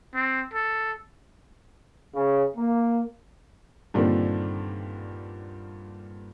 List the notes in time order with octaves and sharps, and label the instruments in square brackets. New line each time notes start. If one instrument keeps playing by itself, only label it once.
[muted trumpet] C4
A4
[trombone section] C#3
A#3
[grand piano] G2 A#2 D3 D#3 C4 D4